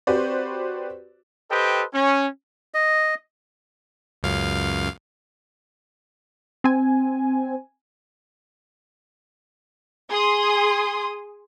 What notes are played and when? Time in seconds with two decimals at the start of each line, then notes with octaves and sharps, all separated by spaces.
0.07 C4 F#4 G4 B4 C5 D5
1.51 G4 A4 B4 C5 D#5 G5
1.94 C#4
2.74 D#5
4.23 C#2 F#2 F5
6.64 C4 G#5
10.11 G#4 C6 D#6